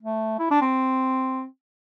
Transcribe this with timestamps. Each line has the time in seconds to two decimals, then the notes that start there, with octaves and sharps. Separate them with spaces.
0.03 A3
0.39 E4
0.51 D4
0.61 C4